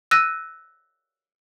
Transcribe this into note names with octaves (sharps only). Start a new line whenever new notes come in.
E6 F#6 A#6 D#7